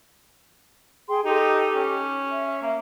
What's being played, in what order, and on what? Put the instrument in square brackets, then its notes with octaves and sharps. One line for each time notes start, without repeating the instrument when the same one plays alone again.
[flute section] G#4 G5 C6
[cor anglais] D#4 [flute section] G4 A4
[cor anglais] C#4
[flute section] E5
[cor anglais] A#3